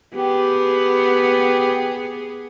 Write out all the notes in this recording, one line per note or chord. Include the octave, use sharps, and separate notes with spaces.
B3 G4 G#4